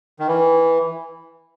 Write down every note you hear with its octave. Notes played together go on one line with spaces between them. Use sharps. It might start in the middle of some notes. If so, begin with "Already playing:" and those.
D#3
E3